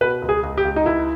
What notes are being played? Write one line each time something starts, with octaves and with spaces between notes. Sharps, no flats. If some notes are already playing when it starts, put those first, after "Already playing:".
B2 B4
C#2
G#4
C#2
G4
C#2
D#4
C#2 E4